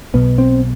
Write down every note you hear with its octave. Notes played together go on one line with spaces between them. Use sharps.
B1 B2 B3
C4